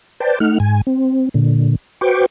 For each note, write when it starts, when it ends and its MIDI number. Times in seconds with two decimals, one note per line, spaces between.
0.20 0.39 71
0.20 0.39 72
0.20 0.39 74
0.20 0.39 79
0.20 0.39 81
0.40 0.58 57
0.40 0.58 63
0.40 0.58 78
0.40 0.58 89
0.60 0.81 44
0.60 0.81 80
0.87 1.29 60
1.34 1.75 46
1.34 1.75 50
2.01 2.26 66
2.01 2.26 71
2.01 2.26 72
2.01 2.26 79
2.01 2.26 85
2.01 2.26 86